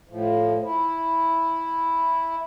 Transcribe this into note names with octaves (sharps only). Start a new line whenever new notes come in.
A2 F3
E4